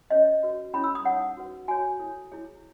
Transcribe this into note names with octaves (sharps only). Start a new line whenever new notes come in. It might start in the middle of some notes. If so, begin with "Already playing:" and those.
C#4 G#4 C#5 D#5
F#4 B4
C#4 E4 A4 C#5 B5
E6
D#6
D#4 G#4 C#5 F#5
F#4 B4
F#4 C#5 G#5
E4 A4 C#5
E4 G#4 C#5